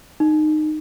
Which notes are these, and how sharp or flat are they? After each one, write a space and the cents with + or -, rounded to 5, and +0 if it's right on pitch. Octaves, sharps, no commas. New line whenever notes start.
D#4 -20